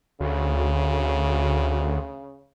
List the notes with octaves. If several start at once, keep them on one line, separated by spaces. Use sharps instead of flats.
D2 C#3